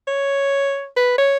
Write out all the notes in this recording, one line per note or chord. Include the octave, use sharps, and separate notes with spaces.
C#5
B4
C#5